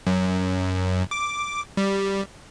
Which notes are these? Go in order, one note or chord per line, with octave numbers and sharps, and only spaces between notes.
F#2
D6
G3